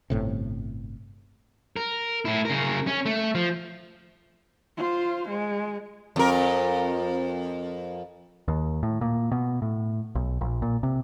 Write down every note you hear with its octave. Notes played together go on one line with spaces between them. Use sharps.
G1 A2 C3
A#4
A2 E4
C#3 A#4
C#4
A3
F3
F4 C5
G#3
F2 A#4
D#2
A2
A#2
B2
A2
B1
A#1
A#2
C3